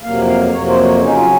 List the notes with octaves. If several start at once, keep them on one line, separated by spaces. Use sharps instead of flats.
F2 C3 F#3 A#3 F5
F5
F2 C3 F#3 A#3 C#5
C5
C#5
C#3 F#3 C#4 D#4
F4